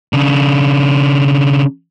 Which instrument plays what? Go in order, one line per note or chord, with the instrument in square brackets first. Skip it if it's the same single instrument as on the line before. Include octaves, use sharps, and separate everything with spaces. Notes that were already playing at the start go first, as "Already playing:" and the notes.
[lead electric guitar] C#3 D4